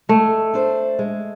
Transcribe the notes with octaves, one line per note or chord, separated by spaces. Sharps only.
G#3 A3
D4 A4 C5
G#3